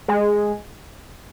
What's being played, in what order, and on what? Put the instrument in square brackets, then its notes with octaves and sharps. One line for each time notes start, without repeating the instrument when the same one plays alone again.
[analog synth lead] G#3